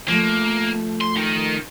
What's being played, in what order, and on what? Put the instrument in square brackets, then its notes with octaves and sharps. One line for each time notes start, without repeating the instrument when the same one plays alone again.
[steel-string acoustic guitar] F3 A3 [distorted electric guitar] A#3
[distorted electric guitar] C6
D#4 A#4